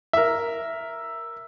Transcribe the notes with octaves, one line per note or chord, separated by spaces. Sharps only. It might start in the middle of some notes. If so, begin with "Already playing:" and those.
A#4 E5